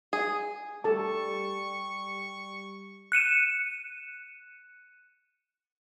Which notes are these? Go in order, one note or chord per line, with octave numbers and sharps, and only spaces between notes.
G#4
G3 A4 A5 C#6
F#6 C#7 D#7 E7